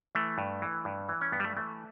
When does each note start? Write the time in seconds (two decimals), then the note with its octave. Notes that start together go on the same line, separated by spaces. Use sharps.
0.15 E3 A3
0.38 G2
0.62 E3
0.85 G2
1.09 E3
1.21 C#4
1.32 G2 B3
1.40 G3
1.44 A3
1.57 E3 A3